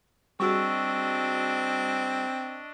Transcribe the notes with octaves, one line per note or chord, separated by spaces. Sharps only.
G3 C4 D4 F#4 G#4 D#5 C#6 E6